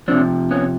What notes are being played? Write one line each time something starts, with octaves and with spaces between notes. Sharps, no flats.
C3 F3 C4 D4
B3 C#4